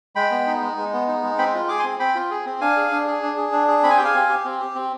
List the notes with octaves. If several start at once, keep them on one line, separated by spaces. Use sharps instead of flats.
G#3 G5 B5
B3
D#4
G#3
G#3
B3
D#4
G#3
C4 G5 B5
F4
G#4 D6
G#5 C6
C4
C4 G5 B5
F4
G#4
C4
D4 F5 G#5
G#4
D4
G#4
D4
G#4
D4
G#4
C4 B5
G#5
G4 G5
F5 G#5
C4
G4
C4
G4
C4